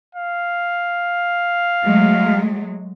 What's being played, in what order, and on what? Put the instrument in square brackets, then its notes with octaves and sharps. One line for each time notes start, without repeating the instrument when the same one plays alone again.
[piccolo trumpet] F5
[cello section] F#3 G#3 A3